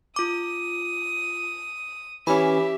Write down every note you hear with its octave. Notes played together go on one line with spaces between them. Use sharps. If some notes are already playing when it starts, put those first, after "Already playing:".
F4 D6 D#6
E3 C#4 G4 E5 B5